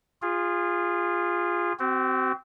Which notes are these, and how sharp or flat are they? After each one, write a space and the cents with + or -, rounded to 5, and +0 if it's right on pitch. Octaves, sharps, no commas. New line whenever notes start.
F4 +0 G#4 -25
C4 -15 F#4 +35